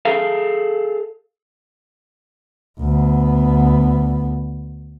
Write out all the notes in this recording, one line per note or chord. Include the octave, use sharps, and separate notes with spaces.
G#4 A4 E5 F5
D2 B3